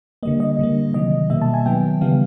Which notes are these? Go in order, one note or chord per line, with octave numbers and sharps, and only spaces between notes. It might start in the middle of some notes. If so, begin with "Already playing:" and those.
D3 G3 A#3 D#5
D#5
D3 G3 A#3
C3 D#3 F#3 D#5
B2 G3 A#3 E5
A5
G#5
D#3 F#3 B3 G5
C#3 E3 G3 B3 F5